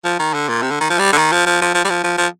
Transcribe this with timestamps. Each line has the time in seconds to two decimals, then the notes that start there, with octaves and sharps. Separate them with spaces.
0.05 F3
0.19 D#3
0.34 D3
0.48 A#2
0.62 C3
0.71 D3
0.81 D#3
0.90 F3
0.99 G3
1.13 D3
1.18 D#3
1.32 F3
1.46 F3
1.62 F3
1.75 F3
1.84 G3
1.90 F3
2.04 F3
2.18 F3